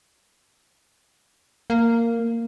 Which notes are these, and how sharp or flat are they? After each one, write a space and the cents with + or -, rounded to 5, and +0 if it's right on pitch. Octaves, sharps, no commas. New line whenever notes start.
A#3 -10